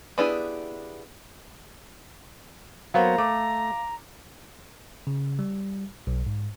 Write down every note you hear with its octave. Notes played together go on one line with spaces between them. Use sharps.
B3 D4 E4 G4 G#4
F#3 A#3 B3 C5 F5 A#5
A3 D6
C#3
G3
B1
G#2